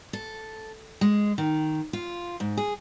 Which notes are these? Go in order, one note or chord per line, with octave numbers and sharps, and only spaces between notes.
A4
G#3
D#3
F4
G#2
G#4